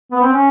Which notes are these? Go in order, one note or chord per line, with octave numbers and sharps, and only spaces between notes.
B3
C4
C#4